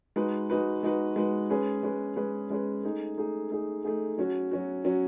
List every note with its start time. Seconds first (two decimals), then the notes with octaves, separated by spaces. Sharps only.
0.16 G#3 D#4 F#4 B4
0.50 G#3 D#4 F#4 B4
0.83 G#3 D#4 F#4 B4
1.16 G#3 D#4 F#4 B4
1.50 G#3 C#4 G#4 B4
1.83 G#3 C#4 G#4 B4
2.16 G#3 C#4 G#4 B4
2.50 G#3 C#4 G#4 B4
2.83 A3 D#4 G#4
3.17 A3 D#4 G#4
3.50 A3 D#4 G#4
3.84 A3 D#4 G#4
4.18 F#3 C#4 F#4
4.51 F#3 C#4 F#4
4.84 F#3 C#4 F#4